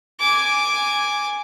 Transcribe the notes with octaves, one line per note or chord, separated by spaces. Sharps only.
G#5 D6